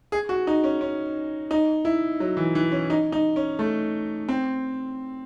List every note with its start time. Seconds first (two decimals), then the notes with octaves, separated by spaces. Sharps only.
0.12 G#4
0.29 F#4
0.47 D#4
0.64 C#4
0.81 C#4
1.51 D#4
1.85 E4
2.20 F#3
2.37 E3
2.55 E3
2.72 C#4
2.90 D#4
3.12 D#4
3.36 C#4
3.59 A3
4.29 C4